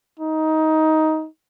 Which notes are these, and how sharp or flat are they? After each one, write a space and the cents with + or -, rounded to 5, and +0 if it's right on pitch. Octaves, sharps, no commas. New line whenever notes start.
D#4 +15